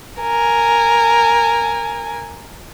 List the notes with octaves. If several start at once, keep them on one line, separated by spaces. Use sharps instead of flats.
A#4 G#5